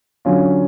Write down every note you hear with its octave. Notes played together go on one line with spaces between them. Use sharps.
D3 F#3 C#4 F4